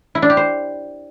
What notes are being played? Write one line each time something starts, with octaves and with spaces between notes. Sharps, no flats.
E4
D4
G4
C5